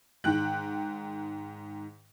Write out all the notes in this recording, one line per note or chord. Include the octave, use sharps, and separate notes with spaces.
G#2 D#3 G5 F#6